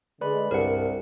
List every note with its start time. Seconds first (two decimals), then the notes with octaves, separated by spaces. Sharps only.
0.21 D3 G#3 B4 D5 B5
0.51 C2 G2 A#4 F#5